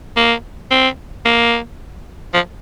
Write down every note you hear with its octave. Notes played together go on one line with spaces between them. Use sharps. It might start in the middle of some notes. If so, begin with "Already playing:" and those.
A#3
C4
A#3
F3